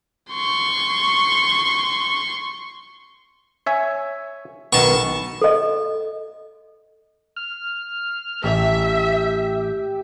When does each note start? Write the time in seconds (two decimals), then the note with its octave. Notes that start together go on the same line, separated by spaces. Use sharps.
0.32 C6 C#6
3.66 C#5 E5 G#5
4.73 B1 D#3 B3 A5 C#6
5.42 A4 D#5
7.37 F6
8.44 A1 G4 E5